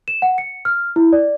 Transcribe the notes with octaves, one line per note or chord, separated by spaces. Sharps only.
E7
F#5
C#7
F6
E4
D5